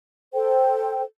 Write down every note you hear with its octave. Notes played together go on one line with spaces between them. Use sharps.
A4 C5 G5